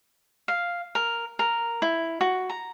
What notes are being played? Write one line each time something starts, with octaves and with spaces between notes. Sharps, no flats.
F5
A#4
A#4
E4
F#4
A#5